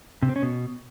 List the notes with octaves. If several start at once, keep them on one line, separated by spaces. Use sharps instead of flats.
C3
C4
C#4
B2